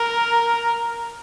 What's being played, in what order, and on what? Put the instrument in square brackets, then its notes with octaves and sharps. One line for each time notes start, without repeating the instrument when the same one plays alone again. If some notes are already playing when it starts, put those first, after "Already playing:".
Already playing: [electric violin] A#4